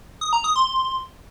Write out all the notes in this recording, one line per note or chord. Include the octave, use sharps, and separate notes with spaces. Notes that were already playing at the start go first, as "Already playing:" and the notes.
D#6
A#5
D#6
C6